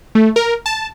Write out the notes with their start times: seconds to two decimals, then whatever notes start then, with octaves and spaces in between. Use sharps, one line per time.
0.15 A3
0.36 A#4
0.66 A5